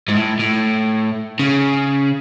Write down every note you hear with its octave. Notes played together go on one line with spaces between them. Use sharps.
G#2
A2
A2
C#3